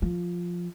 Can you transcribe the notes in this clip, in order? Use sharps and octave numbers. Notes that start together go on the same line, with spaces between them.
F3